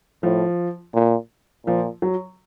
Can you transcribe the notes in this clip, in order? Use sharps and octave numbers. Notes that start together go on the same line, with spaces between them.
A2 F3
A#2
A#2 F3
F#3